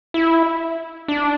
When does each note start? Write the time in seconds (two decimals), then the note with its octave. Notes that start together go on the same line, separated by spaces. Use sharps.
0.14 E4
1.08 D4